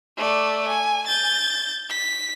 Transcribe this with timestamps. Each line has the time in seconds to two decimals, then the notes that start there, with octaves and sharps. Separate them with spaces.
0.17 A3 D5
0.68 G#5
1.07 G6 A6
1.90 B6